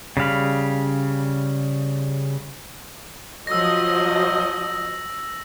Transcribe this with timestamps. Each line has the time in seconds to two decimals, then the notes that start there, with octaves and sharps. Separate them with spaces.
0.17 C#3 G3 F5 B5
3.47 F3 F#3 D#5 E6 A#6